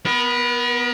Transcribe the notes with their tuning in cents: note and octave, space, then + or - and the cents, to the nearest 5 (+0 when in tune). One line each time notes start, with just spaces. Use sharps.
B3 +0 A#4 +40